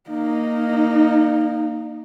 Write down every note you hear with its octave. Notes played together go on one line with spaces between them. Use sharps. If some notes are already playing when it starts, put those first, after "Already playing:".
A#3 D#4